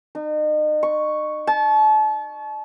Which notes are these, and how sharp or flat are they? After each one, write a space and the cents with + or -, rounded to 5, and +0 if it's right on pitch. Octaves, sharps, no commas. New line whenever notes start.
D#4 -35
C#6 +0
A5 -35